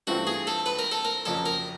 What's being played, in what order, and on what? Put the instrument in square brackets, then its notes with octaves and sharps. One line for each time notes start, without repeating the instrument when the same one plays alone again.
[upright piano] G2 E3 A3 C4 F4 [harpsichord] F#4
[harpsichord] G#4
A4
B4
A#4
A4
A#4
[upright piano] F#1 F2 C#3 F#3 A#3 [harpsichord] A4
[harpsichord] A#4